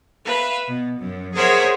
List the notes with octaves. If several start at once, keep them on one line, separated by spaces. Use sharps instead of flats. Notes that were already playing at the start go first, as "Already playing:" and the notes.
B4 E5 F5
B2
F#2
G#4 A#4 C5 C#5 E5 F#5